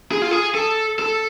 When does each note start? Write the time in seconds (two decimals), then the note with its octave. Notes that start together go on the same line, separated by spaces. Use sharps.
0.12 G#4
0.22 F4
0.31 G#4
0.55 A4
0.99 A4